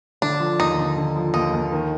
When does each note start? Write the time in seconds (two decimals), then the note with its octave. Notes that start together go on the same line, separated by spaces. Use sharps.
0.22 D3 D4
0.40 F3
0.60 D#2 D#4
0.78 D3
0.96 D3
1.16 F3
1.34 D#2 D#4
1.53 D#2
1.72 D#3